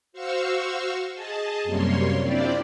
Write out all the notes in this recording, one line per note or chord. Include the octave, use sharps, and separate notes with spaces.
F#4 C5 F5 C#6 E6
G#4 D#5 A5
F#2 C3 G3 A#3 C#5 C6
C4 D4 E4 F4 G4 D5